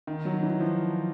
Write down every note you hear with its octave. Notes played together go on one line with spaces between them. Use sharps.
D#3
F#3
E3
F3